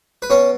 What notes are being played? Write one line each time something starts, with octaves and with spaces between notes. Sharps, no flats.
B4
B2 C#4 C#5